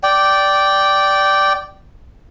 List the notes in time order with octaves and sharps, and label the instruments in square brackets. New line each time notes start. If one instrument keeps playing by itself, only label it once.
[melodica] D5 G5